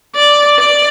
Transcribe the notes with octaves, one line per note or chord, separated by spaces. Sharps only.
D5
D5